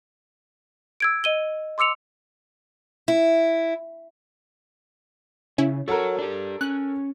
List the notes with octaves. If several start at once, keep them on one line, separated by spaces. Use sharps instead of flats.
E6 G#6 D7
D#5 D#7 G7
C6 D6 E6 C#7 F7
E4
C#3 C#4 E4
F#4 A4 A#4 C#5 F#5
D4 G4
C#4 F#6